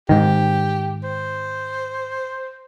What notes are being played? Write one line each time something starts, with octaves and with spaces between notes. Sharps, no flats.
G#2 D#3 G4
C5